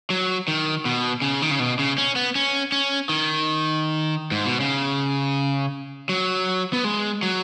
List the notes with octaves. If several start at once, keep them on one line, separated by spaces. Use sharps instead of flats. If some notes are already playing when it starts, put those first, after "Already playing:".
F#3
D#3
B2
C#3
D#3
C#3
B2
C#3
C#4
B3
C#4
C#4
D#3
G#2
B2
C#3
F#3
B3
G#3
F#3